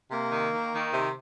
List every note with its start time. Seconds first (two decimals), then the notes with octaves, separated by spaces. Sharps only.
0.11 C3 A#3
0.32 D#3
0.53 D#3
0.73 D#3
0.93 C3